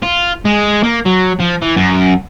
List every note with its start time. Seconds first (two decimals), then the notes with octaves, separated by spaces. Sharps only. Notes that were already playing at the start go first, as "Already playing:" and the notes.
0.03 F4
0.45 G#3
0.84 A#3
1.06 F#3
1.40 F3
1.62 E3
1.76 F#2